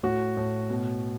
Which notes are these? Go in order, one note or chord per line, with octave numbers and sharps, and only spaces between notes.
A2 F#4
A2
B2